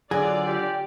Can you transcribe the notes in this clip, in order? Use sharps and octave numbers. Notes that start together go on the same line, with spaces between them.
D3 F#3 F4 G#4 D5
G4